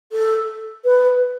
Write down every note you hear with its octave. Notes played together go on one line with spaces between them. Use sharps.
A4
B4